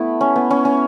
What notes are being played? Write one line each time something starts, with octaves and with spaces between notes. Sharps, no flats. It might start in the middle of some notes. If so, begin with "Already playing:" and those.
Already playing: A3 B3 E4
C#4
B3
C#4
C#4